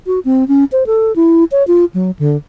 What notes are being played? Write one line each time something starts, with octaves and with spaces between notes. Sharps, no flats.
F#4
C4
C#4
C5
A4
E4
C#5
F4
F#3
D3